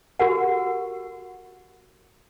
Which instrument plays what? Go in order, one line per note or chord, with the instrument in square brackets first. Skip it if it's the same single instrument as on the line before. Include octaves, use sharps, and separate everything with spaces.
[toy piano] F#4 G4 A#4 F#5